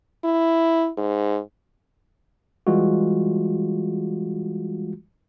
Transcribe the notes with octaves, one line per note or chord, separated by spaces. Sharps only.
E4
G#2
E3 G3 G#3 F4 F#4